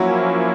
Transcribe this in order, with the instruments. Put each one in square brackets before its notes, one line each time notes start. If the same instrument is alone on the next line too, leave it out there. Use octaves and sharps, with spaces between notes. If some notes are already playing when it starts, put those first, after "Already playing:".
Already playing: [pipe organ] F3 A#3 C#4 E4 [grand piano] F#3